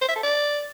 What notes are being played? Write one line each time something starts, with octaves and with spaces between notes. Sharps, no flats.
C5
E5
A4
D5